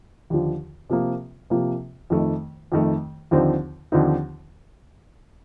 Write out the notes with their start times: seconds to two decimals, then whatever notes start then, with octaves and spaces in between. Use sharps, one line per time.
0.30 D#2 D3 F3
0.90 C3 F3 A#3
1.50 C3 F3 A#3
2.10 F2 D#3 A3
2.72 F2 D#3 A3
3.31 D#2 D3 F3 C4 D#4
3.92 D#2 D3 F3 C4 D#4